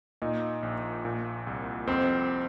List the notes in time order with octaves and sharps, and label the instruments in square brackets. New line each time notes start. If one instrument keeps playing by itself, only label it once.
[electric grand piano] A#2 [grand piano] D#4
[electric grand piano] A#1
A#2
C2
[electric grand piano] F2 [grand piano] C4